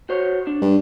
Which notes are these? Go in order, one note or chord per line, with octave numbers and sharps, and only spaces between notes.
F#4 C5 C#5
D4
G2